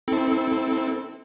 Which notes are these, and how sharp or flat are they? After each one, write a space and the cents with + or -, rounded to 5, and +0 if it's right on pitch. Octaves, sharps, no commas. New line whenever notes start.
C4 +0 E4 -35 A4 +0